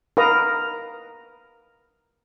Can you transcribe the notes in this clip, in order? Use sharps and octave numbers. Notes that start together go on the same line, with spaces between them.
A#4 B4 F5 A#5 D#6